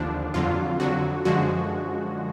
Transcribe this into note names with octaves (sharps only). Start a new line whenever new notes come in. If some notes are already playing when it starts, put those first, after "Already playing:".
Already playing: D#2 D3 F3 D4
F2 D3 F#3 F4
F2 D3 F#3 F#4
F#2 D3 F3 G#3 F#4